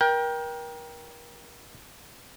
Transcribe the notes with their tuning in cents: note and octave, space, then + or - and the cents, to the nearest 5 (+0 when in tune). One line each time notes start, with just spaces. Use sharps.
A#4 +35 G5 +5